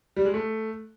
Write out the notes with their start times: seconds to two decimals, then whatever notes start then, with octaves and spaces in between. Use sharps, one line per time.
0.16 G3
0.25 G#3
0.34 A3